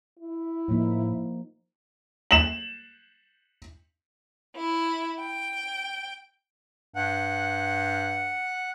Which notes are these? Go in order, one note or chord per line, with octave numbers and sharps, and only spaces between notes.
E4
A2 F3 A#3 D#4
E7 F#7
E4
G5
G2 F#5